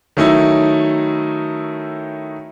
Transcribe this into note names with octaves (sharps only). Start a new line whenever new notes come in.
D#3 F#3 A3 C#4 D#4 E4